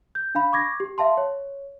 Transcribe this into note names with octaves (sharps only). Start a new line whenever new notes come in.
G6
D4 F5 B5
C#6 D6 G#6 A#6
G4
E5 F5 A5 C6
C#5